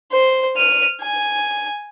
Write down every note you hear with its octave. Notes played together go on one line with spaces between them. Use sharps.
C5
F6 D#7
G#5